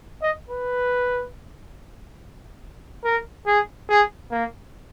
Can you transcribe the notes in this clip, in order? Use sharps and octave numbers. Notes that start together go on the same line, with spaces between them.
D#5
B4
A#4
G#4
G#4
A#3